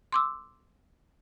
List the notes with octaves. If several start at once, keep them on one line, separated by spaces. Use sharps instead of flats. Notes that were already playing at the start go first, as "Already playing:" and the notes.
C6 D6 E6